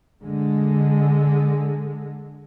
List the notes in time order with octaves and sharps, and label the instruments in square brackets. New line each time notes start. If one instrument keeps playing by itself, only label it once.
[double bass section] D3 G#3